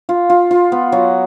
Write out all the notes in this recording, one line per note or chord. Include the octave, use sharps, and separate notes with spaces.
F4
F4
F4
B3
F#3